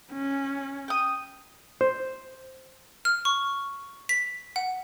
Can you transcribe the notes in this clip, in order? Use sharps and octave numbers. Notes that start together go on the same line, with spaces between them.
C#4
G5 D#6
C5
F6
C#6
B6
F#5